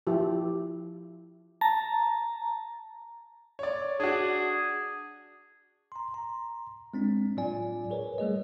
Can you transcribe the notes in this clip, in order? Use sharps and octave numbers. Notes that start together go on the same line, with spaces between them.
F3 E4 G4
A5 A#5
C#5 D5
D4 F#4 G#4
A#5 C6
A#5 C6
G#3 C4 D4
A2 F#3 F4 D5 G#5
G#4 A#4 B4 C#5
G3 A3 G#4 D#5